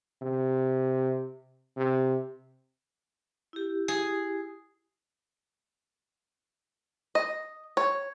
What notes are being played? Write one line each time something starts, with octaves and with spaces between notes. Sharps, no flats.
C3
C3
E4 G4
G#4
D#5
C#5